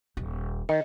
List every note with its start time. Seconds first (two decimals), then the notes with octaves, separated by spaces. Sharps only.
0.17 D#1 D#4
0.69 D#3 D#5